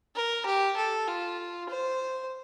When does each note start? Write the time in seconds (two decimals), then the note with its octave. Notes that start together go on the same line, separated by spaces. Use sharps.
0.15 A#4
0.45 G4
0.76 A4
1.07 F4
1.69 C5